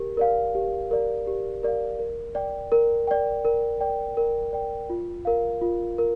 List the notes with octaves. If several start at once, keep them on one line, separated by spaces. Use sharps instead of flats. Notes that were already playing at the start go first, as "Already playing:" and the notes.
Already playing: G4 A#4
A#4 D5 F5
G4
A#4 D5 F5
G4
A#4 D5 F5
A#4
D5 G5
A#4
D5 G5
A#4
D5 G5
A#4
D5 G5
F4
A#4 F5
F4
A#4